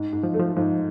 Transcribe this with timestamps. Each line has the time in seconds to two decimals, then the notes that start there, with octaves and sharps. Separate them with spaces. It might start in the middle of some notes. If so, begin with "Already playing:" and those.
Already playing: G#2
0.13 G#2
0.23 F3
0.34 A3
0.40 F3
0.56 G#2 F3